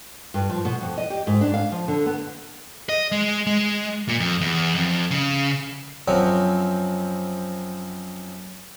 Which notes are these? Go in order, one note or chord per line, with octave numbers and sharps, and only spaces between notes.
G2
F3
B2
F2
D#5
G4
G#2
D4
F5
F3
D3
B3
D#5
G#3
G#3
A#2
F2
E2
F2
C#3
F#2 F3 F#3 C4